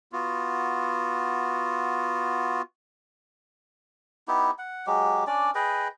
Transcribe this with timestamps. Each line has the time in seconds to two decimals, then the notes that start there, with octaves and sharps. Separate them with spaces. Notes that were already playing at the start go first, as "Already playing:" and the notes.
0.13 B3 F4 F#4
4.28 B3 D#4 E4 G4
4.58 F#5
4.87 F#3 G#3 G4
5.27 C#4 D4 D5
5.55 G#4 B4 D#5 G5